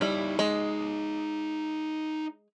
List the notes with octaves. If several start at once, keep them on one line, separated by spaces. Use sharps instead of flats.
G3 D#4 E4 C#5
G#3